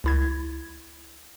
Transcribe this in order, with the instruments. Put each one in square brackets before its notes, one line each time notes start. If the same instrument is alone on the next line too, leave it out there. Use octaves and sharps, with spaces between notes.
[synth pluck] C#2 E4 G#6